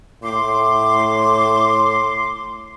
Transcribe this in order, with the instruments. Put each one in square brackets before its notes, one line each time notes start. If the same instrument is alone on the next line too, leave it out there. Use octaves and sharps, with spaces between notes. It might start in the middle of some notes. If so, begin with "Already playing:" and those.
[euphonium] A2 [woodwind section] C6 [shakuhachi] D6